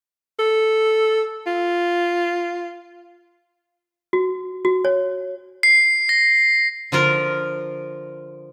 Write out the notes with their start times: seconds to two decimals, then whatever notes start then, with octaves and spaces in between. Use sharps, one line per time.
0.39 A4
1.47 F4
4.13 F#4
4.65 F#4
4.85 C#5
5.63 C7
6.09 A#6
6.92 D3 F3 F4 A#4